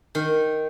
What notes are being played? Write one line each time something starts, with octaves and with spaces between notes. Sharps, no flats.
D#3